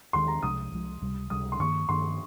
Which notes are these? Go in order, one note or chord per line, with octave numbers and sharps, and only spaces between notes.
D#2 D#3 G#3 C6
A#5
C2 C3 F3 G#3 D#6
C2 C3 F3 G#3
C#2 C3 G3
C#2 C3 G3 D#6
C6
G2 D#3 A#3 C#6
G2 D#3 A#3 C6